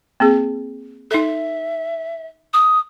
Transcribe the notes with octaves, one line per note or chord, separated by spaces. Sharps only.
A#3 C4 G#4
D#4 A4 E5
D#6